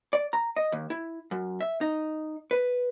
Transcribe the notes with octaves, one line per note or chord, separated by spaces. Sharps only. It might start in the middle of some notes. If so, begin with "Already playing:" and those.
D5
A#5
D#5
D#2
E4
F#2
E5
D#4
B4